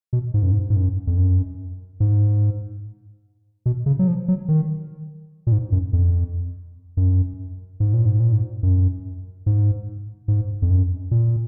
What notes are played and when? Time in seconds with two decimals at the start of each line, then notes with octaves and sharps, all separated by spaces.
0.13 B2
0.34 G#2
0.43 F#2
0.51 G#2
0.70 G#2
0.76 F#2
1.07 F2
1.17 F#2
2.00 G#2
3.66 B2
3.86 C#3
3.99 F#3
4.08 F3
4.28 F#3
4.48 D#3
5.47 A#2
5.52 G#2
5.72 F#2
5.93 F2
6.97 F#2
7.80 G#2
7.93 A#2
8.06 G#2
8.20 A#2
8.33 G#2
8.63 F#2
9.46 G#2
10.28 G#2
10.62 F2
10.70 F#2
11.11 A#2